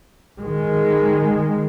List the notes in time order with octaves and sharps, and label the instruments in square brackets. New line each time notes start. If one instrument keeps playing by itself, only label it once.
[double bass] D#3 G#3